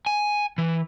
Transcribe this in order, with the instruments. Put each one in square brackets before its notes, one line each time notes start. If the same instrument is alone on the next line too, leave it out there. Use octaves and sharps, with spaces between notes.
[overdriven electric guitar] G#5
E3